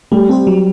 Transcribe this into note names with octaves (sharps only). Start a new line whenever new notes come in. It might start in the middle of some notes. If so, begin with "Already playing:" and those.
G3 A3
C4 G4 C5
F#3